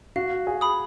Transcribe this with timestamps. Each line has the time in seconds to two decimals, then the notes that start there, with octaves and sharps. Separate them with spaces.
0.16 F#4 F5
0.47 G#4
0.61 B5 D#6